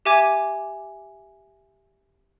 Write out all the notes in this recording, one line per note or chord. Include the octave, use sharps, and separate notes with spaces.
G4 E5 G#5 D6 G#6